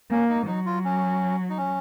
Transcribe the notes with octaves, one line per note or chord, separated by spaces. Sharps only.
A#3 C#4
D#4
F#3 D#4
F4
C#4
D#4
C#4